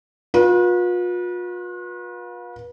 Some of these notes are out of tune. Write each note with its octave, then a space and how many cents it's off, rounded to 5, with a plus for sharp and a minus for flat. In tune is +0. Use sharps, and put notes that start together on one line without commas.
F4 +40 B4 -35